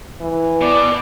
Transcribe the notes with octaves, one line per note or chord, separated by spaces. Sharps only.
E3
B2 D5